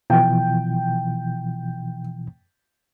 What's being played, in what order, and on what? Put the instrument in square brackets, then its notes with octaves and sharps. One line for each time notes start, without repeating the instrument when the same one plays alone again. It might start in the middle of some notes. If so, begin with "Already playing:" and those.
[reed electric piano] B2 E3 F3 [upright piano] G5